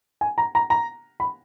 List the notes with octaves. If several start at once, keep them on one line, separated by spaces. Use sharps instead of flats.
G#5
A#5
A#5
A#5
B5